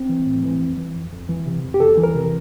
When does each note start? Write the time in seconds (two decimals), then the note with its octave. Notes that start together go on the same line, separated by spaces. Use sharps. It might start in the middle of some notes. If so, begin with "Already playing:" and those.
Already playing: C4
0.09 E3
0.26 A2
0.43 E3
0.60 F2
0.77 E3
0.95 F2
1.12 F2
1.29 E3
1.46 C3
1.64 F2
1.74 G4
1.80 E2 A4
1.98 E3
2.03 A#4
2.15 C3